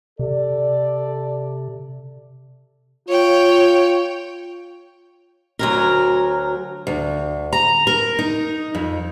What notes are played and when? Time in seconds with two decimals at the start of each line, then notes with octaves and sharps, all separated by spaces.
0.19 C3 A4 D5
3.08 F4 C#5 G5
5.59 D2 F#3 A#4
6.87 D2
7.53 A#5
7.87 A#4
8.19 D#4
8.75 F2